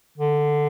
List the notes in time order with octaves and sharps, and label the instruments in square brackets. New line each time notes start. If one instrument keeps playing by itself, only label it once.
[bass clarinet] D3